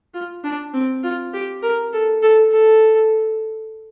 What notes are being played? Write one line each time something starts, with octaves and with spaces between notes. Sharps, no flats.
F4
D4
C4
F4
G4
A#4
A4
A4
A4